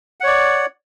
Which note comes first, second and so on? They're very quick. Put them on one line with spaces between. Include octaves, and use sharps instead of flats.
F#5 C#5 D5